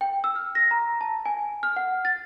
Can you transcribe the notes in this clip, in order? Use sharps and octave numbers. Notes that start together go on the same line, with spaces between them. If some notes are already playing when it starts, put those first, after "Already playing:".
G5
E6
F6
A#6
A#5
A5
G#5
F6
F#5
A6